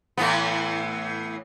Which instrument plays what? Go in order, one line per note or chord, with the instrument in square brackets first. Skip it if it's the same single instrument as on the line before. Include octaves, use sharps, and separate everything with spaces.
[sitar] A2 E3 B3